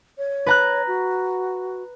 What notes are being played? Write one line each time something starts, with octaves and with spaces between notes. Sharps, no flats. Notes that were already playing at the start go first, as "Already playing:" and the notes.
C#5
B4 A#5 F#6
F#4